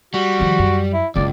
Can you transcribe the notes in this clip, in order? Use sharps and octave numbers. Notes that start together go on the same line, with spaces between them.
G3 F#4
D#3 F3
F#2
E4
F#1 C#2 D3 D5